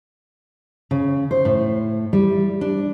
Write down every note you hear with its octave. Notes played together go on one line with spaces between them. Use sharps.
C#3
C5
A2
G3
D4